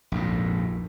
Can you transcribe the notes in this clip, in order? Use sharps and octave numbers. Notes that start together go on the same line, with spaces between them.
A#1 F2 G#2